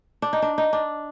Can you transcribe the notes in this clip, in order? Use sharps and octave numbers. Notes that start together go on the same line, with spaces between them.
D4
D#4
D4
D#4
D4